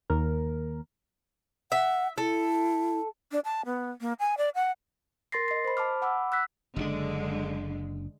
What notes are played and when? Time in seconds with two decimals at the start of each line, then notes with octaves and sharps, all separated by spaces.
0.10 D#2 A#4
1.72 E5 F#5
2.18 E4 A4
3.32 D4
3.45 A5
3.66 B3
4.01 A#3
4.20 G#5
4.38 D5
4.55 F#5
5.32 A#4 C6 A6 A#6 C7
5.48 D#5 C7
5.65 C5 B5
5.77 A5 B5 D6 F6
6.02 F#5 B5 D6 E6
6.32 E6 F#6 B6
6.76 F#1 B2 D3 G#3 D4